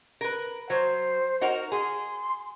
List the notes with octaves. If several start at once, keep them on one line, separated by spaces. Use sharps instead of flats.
A#4 B4
F#3 C5
D#4 F#4 A#4
G#4 C6